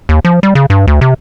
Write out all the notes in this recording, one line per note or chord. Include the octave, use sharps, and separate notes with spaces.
D#2
F3
G3
C#3
G2
D2
C3